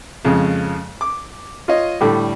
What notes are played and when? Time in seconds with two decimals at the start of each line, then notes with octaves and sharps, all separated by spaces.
0.25 F2 C#3 G#3
1.01 D6
1.68 F4 C#5 D#5
2.00 A2 D3 G3 G4